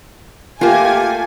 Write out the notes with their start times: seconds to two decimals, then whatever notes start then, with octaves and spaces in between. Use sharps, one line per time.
0.61 A3 A#3 F4 G4 G#5